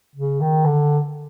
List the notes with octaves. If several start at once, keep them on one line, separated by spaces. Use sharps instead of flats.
C#3
D#3
D3